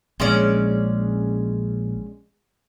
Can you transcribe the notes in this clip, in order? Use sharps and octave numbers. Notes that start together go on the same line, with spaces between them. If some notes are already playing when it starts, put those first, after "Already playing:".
A#1 G#3 C#4 D5